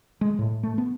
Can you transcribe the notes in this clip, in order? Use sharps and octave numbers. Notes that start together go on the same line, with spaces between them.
G#3
A2
A3
B3